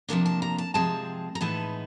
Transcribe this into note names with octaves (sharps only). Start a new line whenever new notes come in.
C3 F3 A#3 D4 A5
A5
A#5
A5
C3 F3 G#3 C4 A5
A#5
A2 E3 G#3 B3 D#4 A5